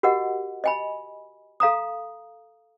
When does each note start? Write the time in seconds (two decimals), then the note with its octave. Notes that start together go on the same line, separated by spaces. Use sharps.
0.03 F#4 G4 A#4 D#5 F#5
0.64 D#5 G#5 B5
1.60 A4 F5 A#5 D#6